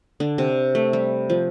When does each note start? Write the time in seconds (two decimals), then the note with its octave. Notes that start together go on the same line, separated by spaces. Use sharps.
0.20 D3 D4
0.38 C3 C4
0.75 A3
0.93 G3
1.30 F3